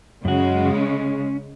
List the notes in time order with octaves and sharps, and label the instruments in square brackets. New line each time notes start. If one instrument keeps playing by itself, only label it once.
[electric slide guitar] F#2 F#4 [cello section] C#3 G#3
[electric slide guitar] C#4